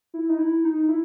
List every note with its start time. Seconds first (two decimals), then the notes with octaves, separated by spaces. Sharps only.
0.14 E4
0.29 D#4
0.39 E4
0.64 D#4
0.88 E4